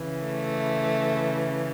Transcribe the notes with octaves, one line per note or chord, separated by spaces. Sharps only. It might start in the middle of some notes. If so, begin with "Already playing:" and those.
Already playing: C#3 E3
A3